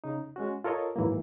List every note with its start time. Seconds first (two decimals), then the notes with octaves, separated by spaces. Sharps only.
0.04 C#3 D#4
0.36 G#3 C#4 F#4
0.64 F4 A4 A#4 C#5 D#5
0.96 G#2 E3 F#3 A#3